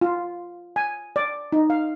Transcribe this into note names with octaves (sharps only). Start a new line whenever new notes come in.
F4
G#5
D5
D#4
F5